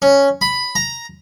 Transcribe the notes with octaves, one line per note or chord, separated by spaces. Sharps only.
C#4
B5
A#5